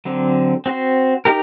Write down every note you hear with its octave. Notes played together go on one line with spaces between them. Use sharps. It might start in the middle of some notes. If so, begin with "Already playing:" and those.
D3 F#3 C4
C4 F#4 C5
D#4 G4 A#4